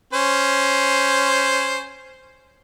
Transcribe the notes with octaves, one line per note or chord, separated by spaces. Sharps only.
C#4 C5